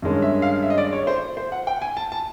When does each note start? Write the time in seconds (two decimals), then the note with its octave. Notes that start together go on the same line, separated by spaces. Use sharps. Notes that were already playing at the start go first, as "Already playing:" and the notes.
0.02 G2 D#3 G#3 C#4
0.22 E5
0.42 F5
0.62 E5
0.70 D#5
0.78 D5
0.93 C#5
1.07 C5
1.37 C5
1.52 F#5
1.67 G5
1.82 G#5
1.97 A5
2.12 A5